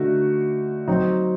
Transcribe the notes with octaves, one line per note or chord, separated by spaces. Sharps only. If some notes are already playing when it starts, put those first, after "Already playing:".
Already playing: D3 A3 D#4 F#4
F#3 C4 D#4